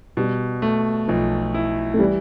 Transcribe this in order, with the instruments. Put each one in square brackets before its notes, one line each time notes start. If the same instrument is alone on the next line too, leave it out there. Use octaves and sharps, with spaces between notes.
[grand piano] B2 [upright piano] G3
[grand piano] A3
[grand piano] B1 [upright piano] F3
[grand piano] E4
[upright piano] A3
[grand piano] E3 [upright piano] G3